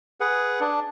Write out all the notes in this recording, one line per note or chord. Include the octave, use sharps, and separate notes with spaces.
G#4 B4 F#5
D4